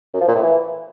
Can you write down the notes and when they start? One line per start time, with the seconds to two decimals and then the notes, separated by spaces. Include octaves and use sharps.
0.14 F#2
0.21 F3
0.28 A#2
0.35 A2
0.43 E3